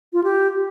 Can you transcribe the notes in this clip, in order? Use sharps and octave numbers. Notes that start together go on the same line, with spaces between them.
F4
G4